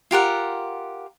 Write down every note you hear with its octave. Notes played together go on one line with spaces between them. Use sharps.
F4 G4 A#4 F#5